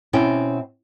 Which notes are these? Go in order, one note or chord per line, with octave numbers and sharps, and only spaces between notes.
B2 C4 C#4 E4 G5